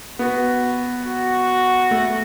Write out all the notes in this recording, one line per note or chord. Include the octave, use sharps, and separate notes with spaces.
B3 F#4
F#4
A3